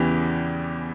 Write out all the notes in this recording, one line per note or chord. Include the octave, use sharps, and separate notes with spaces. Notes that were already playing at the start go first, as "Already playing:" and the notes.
Already playing: E2 C#3 E3 G4